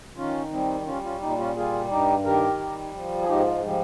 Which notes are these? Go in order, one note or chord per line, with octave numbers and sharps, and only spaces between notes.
D#3 C#4 F4
G3 C4 D#4
G3 C#4 F4
C#4 F4
A#2 D#4 G4
C#4 F4
G3 F4 G#4
G2 D#4 G4
D#3 G4 A#4
G3
F3
G#4
G#2 D#4 G4
G#3
F3 G3